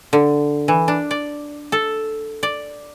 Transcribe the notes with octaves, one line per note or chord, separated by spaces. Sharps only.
D3
E3
D4
D5
A4
D5